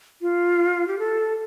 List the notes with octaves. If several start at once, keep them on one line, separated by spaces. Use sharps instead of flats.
F4
G4
A4